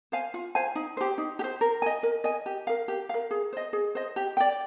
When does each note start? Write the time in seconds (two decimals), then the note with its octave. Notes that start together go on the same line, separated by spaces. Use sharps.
0.12 C5 F5 G#5
0.34 F4
0.55 C5 F5 G#5
0.75 D#4
0.97 G4 C5
1.18 D#4
1.39 G4
1.44 C5
1.61 A#4
1.82 D#5 G#5
2.03 A#4
2.24 D#5 G#5
2.46 G4
2.67 A#4 F5
2.88 G4
3.09 A#4 F5
3.31 G#4
3.53 C5 D#5
3.73 G#4
3.95 C5 D#5
4.16 G4
4.37 D5 G5